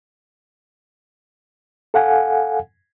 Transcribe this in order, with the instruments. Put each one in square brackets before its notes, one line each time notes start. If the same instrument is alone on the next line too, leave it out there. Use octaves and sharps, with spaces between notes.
[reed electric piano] A4 F5 F#5 G#5